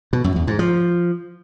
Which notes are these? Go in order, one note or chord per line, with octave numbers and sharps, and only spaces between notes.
B2
F#2
E2
G#2
F3